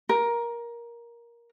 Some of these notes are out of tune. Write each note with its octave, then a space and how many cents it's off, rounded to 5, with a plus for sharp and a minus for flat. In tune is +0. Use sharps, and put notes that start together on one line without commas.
A#4 +15